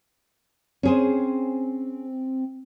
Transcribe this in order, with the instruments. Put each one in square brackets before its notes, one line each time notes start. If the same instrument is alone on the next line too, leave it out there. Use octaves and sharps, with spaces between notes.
[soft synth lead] C4 [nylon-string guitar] C#4 G#4 C5